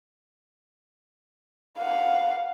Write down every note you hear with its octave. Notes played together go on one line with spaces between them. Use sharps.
F5 F#5